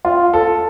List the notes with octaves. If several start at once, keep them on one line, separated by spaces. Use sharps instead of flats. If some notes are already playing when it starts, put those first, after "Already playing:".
F4
A4